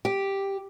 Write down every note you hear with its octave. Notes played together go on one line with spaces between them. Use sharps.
G4